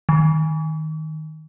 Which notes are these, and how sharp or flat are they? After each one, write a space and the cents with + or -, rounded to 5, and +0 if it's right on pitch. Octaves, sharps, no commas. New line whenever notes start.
D#3 +10